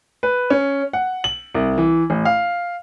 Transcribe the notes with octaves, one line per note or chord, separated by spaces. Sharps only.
B4
C#4
F#5
F#7
C2
E3
A1
F5